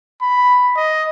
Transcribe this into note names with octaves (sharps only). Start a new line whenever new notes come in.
B5
D#5